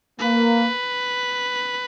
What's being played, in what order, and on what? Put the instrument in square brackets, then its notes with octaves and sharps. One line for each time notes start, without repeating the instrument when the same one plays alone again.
[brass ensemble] A#3 [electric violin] B4